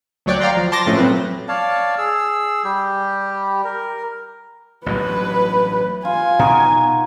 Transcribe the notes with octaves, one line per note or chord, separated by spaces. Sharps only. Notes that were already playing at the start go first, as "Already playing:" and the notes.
D2 F#3 C#5 D5 G5 F#6
D5 F5 G5 A#5 C6
F3
A5 C6 D6 A6 A#6
F#2 A2 F3 A3 C#4
A#2 F#3 C4 B4
C#5 D5 F5 A5
G#4 E6
G3 G4
A#4
A1 G2 F#3 B4
F4 G#5
B2 D#4 F#4